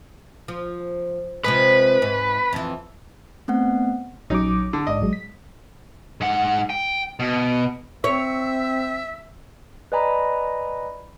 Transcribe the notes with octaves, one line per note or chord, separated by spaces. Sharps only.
F3
C3 F3 G#3 B4
G#2
F2 E3
A3 B3 C4 F#5
A#1 F#3 C#4 D#4 D6
D3
A1 G#2 D5 D#5
A1 F#3 G#3
B6
G#2 F#5
G5
B2
C4 C#5 E5
B4 D5 D#5 G#5 A#5 B5